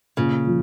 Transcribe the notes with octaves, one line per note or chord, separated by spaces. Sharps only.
A#2 C#3
F3